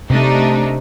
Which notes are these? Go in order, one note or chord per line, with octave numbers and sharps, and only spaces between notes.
C3 A3 D4 D#4